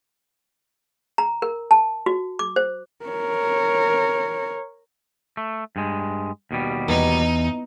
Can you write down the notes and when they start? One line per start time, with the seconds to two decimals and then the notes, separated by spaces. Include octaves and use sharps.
1.18 A#5
1.42 A#4
1.71 A5
2.06 F#4
2.39 D6
2.56 C5
3.05 A#4 C#5
5.37 A3
5.76 G2 G#3
6.51 D#2 B2 G3
6.88 E2 D#4